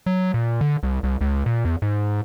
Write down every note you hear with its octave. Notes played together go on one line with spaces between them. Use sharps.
F#3
A#2
D3
C2
C2
C#2
A#2
E2
G#2